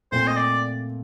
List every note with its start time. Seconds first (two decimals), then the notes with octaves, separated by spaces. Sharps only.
0.12 A#2 A3 C4 C5
0.27 D#5
0.36 D5